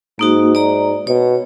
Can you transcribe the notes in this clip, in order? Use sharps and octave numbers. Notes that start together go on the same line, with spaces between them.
G#2 A#3 D#4 F#4
D5 A#5
B2 C#5